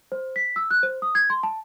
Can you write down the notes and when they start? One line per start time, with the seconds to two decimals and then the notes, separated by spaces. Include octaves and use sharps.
0.12 C5
0.36 B6
0.56 E6
0.71 F#6
0.83 C5
1.02 D#6
1.15 G#6
1.30 C6
1.43 A5